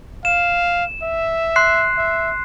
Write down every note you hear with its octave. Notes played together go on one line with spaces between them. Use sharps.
F5 E7
E5
C6 F#6 C7
E5